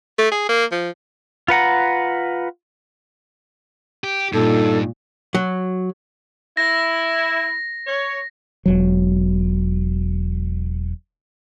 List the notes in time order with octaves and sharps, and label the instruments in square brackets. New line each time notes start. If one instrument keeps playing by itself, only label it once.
[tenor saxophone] A3
G#4
A#3
F3
[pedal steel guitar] F4 B4 F#5 A#5
[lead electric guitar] G4
[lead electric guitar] G2 [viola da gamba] A#2 [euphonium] D#4 [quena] A4
[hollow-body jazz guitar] F#3
[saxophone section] E4 [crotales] A#6
[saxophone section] C#5
[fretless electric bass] E1 F#3